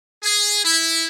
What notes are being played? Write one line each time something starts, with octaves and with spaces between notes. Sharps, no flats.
G#4
E4